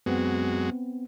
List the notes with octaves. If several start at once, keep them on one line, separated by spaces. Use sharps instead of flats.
F#2 G#3 B3 C4 F#4